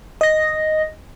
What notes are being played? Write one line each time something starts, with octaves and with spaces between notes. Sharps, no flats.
D#5 A#6